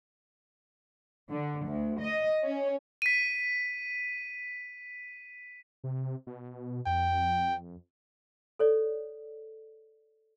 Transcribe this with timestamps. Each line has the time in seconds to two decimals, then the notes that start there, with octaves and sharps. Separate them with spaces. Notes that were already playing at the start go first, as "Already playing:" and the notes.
1.31 D3
1.66 D2
2.00 D#5
2.43 C#4
3.02 B6 D#7
5.84 C3
6.27 B2
6.86 F2 G5
8.59 A4 C#5 D5